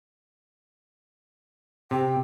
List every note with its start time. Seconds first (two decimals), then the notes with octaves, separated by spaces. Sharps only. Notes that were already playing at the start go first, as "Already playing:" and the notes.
1.91 C3 G5